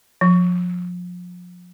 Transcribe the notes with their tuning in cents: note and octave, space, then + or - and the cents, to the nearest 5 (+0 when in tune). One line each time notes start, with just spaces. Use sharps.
F3 +30